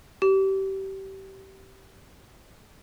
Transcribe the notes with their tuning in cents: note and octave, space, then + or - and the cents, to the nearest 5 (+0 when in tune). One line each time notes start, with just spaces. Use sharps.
G4 -25